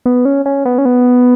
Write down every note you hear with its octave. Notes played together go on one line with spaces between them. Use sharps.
B3
C#4
C#4
B3
C#4
B3